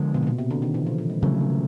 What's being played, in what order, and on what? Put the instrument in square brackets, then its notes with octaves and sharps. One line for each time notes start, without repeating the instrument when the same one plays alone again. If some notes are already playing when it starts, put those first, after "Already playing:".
Already playing: [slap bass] D3 F3 G#3 B3
[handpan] B2
A#2
B2
C3
D3
D#3
E3
F3
F3
G#3
[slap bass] C#3 F#3 A3 [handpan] E3
[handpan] D#3